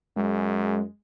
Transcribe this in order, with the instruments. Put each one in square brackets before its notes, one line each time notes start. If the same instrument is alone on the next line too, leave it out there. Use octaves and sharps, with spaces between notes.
[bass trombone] F#2 [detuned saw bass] G#3